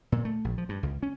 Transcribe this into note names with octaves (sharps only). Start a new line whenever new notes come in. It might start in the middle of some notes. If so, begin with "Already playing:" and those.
A#2
A3
A#1
F3
G2
C#2
C#4